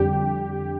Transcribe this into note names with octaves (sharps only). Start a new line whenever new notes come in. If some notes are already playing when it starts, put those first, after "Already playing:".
Already playing: F2 D3 G3 G4